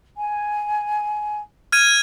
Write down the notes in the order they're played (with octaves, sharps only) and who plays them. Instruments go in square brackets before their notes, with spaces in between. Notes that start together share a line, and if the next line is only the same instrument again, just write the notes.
[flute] G#5
[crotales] F6 G#6 D#7